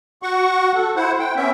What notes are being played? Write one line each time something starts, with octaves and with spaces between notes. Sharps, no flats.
F#4 F#5 C#6
A4
E4 C5 F#5
G5
B3 C#4 E5